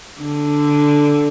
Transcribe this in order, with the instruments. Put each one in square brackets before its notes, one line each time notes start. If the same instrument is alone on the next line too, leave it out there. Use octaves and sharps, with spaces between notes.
[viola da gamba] D3